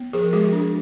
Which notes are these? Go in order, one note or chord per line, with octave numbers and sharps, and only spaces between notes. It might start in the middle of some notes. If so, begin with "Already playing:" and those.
Already playing: B3
F3 G#4 A#4
G#3 F#4 G#4
D4